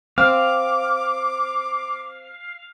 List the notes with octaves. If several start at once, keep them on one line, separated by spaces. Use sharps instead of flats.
C4 F5 D6